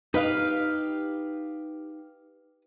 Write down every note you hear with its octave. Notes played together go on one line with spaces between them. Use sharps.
D#4 G4 B4 D#5 F5